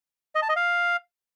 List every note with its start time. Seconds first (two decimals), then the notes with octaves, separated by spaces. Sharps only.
0.35 D#5
0.42 A5
0.49 D#5
0.56 F5